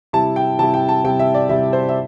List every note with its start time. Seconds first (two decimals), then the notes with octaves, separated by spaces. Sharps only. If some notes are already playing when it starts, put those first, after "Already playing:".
0.13 C3 G3 E4 A5
0.36 G5
0.59 C3 G3 E4 A5
0.74 G5
0.89 A5
1.04 C3 G3 E4 G5
1.19 E5
1.34 D5
1.49 C3 G3 E4 E5
1.73 C5
1.89 E5